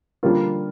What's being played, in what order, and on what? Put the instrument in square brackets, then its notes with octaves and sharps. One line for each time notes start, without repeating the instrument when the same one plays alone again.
[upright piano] D3 G3 A#3 F4